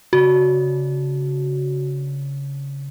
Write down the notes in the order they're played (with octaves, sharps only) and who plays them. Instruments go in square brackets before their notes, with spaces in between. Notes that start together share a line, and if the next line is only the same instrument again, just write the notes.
[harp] C#3 D4 [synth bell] F#4